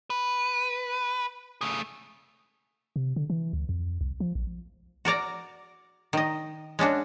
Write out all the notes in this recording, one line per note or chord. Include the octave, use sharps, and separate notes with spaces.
B4
A3 G#4
C3
D3
E3
D2
F2
C2
F3
A#1
F#4 A#4 D5 A#5
D#3 D#5
G#3 C#4 D4 F#4